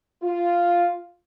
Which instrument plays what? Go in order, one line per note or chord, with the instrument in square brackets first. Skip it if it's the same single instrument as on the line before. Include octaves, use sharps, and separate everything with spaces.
[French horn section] F4